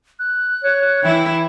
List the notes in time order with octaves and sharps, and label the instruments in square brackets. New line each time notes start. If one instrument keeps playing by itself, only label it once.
[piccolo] F#6
[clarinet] C#5
[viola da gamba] E3 E4 [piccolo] G5